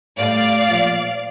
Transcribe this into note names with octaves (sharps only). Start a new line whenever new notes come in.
A2 G3 D5 F5
A#2 F3